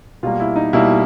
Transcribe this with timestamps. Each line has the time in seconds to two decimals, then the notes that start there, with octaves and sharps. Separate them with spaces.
0.23 B2 G3 A#3 F4
0.40 E4
0.56 D#4
0.73 B2 G3 A#3 E4